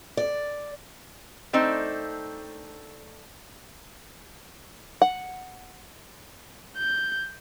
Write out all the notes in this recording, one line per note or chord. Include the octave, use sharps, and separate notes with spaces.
D5
A3 C4 D4 D#4
F#5
G6